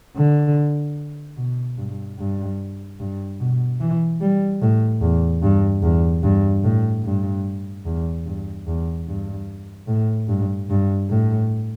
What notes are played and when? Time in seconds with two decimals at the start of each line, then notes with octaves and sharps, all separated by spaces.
0.16 D3
1.37 B2
1.78 G2
2.19 G2
3.00 G2
3.40 B2
3.80 E3
4.21 G3
4.62 A2
5.02 E2
5.43 G2
5.83 E2
6.23 G2
6.64 A2
7.05 G2
7.86 E2
8.26 G2
8.67 E2
9.08 G2
9.88 A2
10.29 G2
10.70 G2
11.10 A2